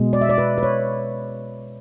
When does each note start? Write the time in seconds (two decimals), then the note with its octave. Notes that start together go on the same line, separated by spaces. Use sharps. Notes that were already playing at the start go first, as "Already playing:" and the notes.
Already playing: B2 G#3
0.13 D5
0.21 E5
0.29 D5
0.38 B4
0.58 B4
0.63 C#5